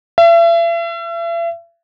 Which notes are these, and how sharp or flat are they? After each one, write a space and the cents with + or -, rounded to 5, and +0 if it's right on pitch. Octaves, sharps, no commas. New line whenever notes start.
E5 +40